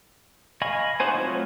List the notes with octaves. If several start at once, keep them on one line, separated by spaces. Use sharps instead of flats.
D#5 F5 G#5 B5 C#6
D#4 F#4 C5 G#5
F#3 A3 C4 F4